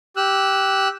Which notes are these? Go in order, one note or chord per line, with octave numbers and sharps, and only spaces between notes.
G4 E6 F#6